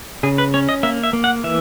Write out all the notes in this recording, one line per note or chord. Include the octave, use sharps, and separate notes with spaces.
C#3 G#4
B4
C#4 C#5
D#5
A#3 E5
E5
A#3
F#5
E3 E5